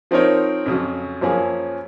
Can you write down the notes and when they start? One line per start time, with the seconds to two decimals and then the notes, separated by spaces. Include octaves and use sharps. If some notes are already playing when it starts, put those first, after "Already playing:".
0.11 F3 C4 D#4 A#4 C#5
0.66 F2 C#3 F#3
1.21 F#2 F3 A#3 C#4 G#4